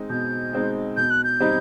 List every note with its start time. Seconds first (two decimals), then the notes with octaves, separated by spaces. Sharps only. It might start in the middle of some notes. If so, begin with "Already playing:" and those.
Already playing: G#3 C4 D#4
0.10 B2 G6
0.53 G#3 C4 D#4
0.97 B2 G6
1.10 F#6
1.24 G6
1.40 G3 C4 D#4